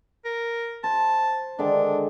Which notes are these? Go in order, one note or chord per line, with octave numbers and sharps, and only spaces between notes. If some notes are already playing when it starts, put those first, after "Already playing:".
A#4
C5 A5
D3 D#3 G#3 D4